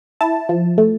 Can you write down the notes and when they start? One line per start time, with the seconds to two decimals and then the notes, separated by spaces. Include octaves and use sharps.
0.21 E4 A5
0.49 F3
0.78 A3